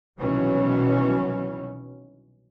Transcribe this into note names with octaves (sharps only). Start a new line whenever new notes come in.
C2 B2 D#3 E3 F#3 C#4